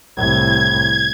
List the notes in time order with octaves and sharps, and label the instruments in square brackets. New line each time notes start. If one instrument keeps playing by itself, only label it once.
[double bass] C2 A2 [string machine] G#6